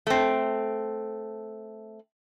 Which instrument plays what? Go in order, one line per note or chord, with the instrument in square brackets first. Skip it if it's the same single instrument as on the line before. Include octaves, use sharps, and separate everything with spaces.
[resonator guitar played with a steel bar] A3 C4